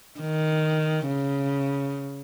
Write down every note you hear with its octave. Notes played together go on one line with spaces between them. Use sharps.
D#3
C#3